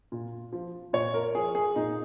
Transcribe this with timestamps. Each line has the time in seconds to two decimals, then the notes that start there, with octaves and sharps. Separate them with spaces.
0.12 A#2
0.53 F3
0.93 A#2 C#5
1.14 A#4
1.35 F3 G#4
1.55 G#4
1.75 A#2 D#4